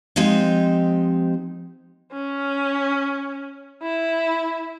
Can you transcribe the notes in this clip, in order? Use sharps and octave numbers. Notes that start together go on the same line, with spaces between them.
F3 G#3 C4 D#4 G4
C#4
E4